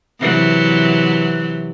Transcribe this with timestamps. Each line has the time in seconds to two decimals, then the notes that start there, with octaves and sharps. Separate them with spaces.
0.20 C3 E3 F#3